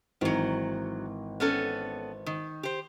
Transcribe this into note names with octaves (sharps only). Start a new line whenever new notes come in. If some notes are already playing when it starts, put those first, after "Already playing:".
G#1 D#3 E3 F#3
B3 C#4 A4
D#3
G4 C5